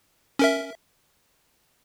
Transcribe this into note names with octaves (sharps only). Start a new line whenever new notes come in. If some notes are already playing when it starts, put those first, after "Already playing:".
C#4 A#4 E5